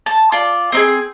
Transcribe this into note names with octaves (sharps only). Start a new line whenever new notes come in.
A5
F4 D5
C4 D#4 G#4